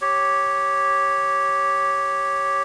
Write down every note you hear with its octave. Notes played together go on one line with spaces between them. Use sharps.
G4 C#5